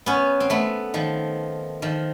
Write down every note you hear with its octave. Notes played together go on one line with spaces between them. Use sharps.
B3 C#4
C4
A3 B3
D#3 F3
D#3 F3